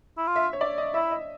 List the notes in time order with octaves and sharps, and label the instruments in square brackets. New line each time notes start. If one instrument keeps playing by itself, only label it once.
[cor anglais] E4
F4
[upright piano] E5
C#5
D5
D#5
[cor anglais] E4 [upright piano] E5
[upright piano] D#5